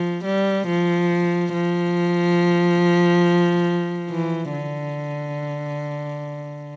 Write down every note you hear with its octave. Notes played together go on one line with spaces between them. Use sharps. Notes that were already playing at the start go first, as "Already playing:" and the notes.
Already playing: F3
G3
F3
F3
E3
D3